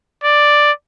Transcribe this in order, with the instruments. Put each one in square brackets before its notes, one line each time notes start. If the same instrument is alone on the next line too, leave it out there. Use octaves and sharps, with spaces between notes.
[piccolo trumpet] D5